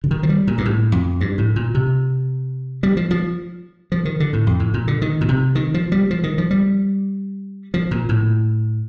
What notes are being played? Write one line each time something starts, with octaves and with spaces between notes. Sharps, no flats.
D3
D#3
F3
G3
A#2
G2
A2
F2
G2
A2
A#2
C3
G3
F3
F3
F3
D#3
D3
A2
F2
A2
A#2
D3
D#3
A#2
C3
D#3
F3
G3
F3
D#3
F3
G3
F3
A#2
A2